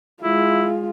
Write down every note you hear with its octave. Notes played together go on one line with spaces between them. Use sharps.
G#3 E4 F4